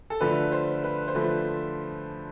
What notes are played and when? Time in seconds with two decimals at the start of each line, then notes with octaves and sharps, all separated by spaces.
0.10 A4
0.21 D3 F3 A3 B4
0.52 C5
0.84 B4
1.08 C5
1.15 D3 F3 A3 B4